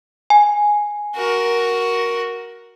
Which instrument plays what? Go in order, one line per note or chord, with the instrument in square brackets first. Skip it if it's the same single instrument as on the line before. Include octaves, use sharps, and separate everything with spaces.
[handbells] G#5
[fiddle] F#4 A#4